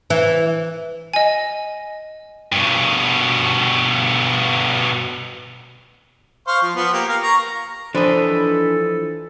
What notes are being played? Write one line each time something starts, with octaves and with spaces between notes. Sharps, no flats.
E3
D#5 G#5
G2 B2
C5 F5 C#6
F3
F3 B3
A#3 G4
A#4 F5
A#5 C#6
E3 F3 D4 A4 B4 D#5